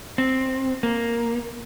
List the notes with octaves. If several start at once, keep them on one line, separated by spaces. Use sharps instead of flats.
C4
A#3